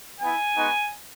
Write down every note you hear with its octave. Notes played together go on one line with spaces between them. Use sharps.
B3 E4 G#5
G#3 B3 D#4 F#4